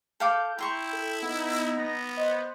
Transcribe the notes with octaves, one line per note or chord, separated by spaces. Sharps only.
A4 F5 D6 G6
E4 G5 A#5 C6 C#6
A4
B3 D#4
B3 A#6
C5 D#5